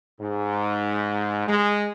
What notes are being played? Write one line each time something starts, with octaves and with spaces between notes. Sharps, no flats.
G#2
G#3